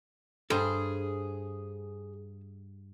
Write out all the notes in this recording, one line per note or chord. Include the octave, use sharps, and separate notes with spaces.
G2 G#4 A4 C5